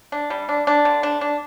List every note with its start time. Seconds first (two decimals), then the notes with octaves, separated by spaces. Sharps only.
0.12 D4
0.30 G3
0.49 D4
0.67 D4
0.85 D3
1.03 D4
1.21 D4